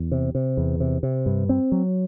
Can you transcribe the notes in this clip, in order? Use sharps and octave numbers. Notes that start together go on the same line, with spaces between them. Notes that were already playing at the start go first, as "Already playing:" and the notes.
Already playing: E2
C3
C3
E2
C3
C3
G2
C4
F#3